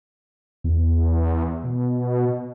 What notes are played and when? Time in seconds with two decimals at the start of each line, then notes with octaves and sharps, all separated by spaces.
0.64 E2
1.64 B2